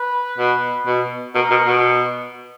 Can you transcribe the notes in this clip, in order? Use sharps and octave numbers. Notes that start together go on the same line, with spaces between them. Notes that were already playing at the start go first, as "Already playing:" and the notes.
Already playing: B4
B2
B2
B2 A#4
B2
B2